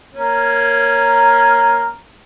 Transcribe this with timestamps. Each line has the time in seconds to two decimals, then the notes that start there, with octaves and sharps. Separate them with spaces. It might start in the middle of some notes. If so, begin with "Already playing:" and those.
0.15 A#3 C#4